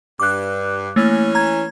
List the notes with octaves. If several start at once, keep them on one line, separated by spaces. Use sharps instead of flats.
G2 D6 F#6
E3 A3 A#3 C#4
A#5 G#6